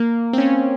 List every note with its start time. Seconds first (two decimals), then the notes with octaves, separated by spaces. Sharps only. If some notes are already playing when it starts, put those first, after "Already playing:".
Already playing: A#3
0.33 C4
0.38 C#4